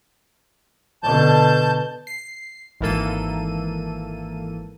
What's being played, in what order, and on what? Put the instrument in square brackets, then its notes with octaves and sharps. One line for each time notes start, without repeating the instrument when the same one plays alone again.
[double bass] B2 D3 [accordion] A5 G6
[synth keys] C7
G#1 E3 A#3 A4 D#7